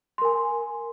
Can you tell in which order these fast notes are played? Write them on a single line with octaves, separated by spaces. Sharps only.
C6 A#4 G#5